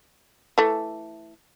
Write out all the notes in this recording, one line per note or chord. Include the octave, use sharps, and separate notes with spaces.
E3 A3